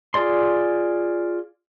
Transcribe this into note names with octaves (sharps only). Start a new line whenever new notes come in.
F4 G#4 D5 C6